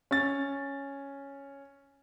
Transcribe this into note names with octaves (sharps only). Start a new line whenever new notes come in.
C#4 A6